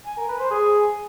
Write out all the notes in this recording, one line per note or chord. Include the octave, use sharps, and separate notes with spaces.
G#5
A#4
B4
C5
G#4